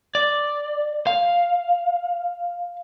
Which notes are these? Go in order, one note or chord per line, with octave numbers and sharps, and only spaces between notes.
D5
F5